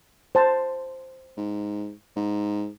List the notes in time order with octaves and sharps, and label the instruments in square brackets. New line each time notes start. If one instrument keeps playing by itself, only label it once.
[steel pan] C5 A5
[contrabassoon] G#2
G#2